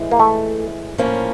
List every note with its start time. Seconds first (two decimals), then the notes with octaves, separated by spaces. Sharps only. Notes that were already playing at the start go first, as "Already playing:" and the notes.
Already playing: A2 E3 G#3
0.11 A#3
0.19 A3
0.98 A2 F3 A#3 C#4